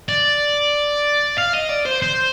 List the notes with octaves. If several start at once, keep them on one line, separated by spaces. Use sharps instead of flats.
D5
F5
D#5
D5
C5
C5